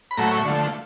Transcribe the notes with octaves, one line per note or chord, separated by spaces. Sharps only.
B5
A2 F#3 A3 A#5
C#6
D3 F3 A3